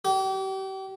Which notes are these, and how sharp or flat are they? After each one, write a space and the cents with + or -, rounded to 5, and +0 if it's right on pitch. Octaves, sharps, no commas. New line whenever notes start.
G4 -35